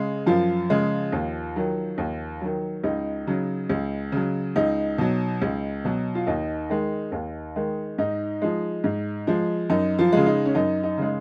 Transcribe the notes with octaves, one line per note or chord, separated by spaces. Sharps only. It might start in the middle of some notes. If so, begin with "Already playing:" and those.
Already playing: C#3 G#3
F#2 F3 F4
C#3 G#3
D#2
D#3 F#3
D#2
D#3 F#3
C#2 D#4
C#3 F#3
C#2
C#3 F#3
C#2 D#4
B2 F#3
C#2
B2 F#3
F4
D#2 D#4
D#3 G#3
D#2
D#3 G#3
G#2 D#4
F3 G#3
G#2
F3 G#3
F#2 D#4
F3 F4
C#3 G#3
D#4
C#4
F#2 D#4
D#4
C#3 G#3